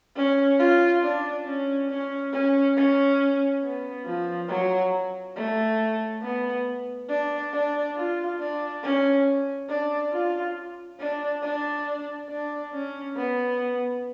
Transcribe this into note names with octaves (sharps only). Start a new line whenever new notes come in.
C#4
F4
D4
C#4
C#4
C#4
C#4
B3
F3
F#3
A3
B3
D4
D4
F4
D4
C#4
D4
F4
D4
D4
D4
C#4
B3